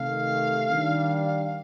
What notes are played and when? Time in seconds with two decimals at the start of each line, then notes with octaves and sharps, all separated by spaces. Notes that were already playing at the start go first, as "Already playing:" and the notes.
Already playing: C3 D#3 A3 F5
0.69 D#3 G3 D4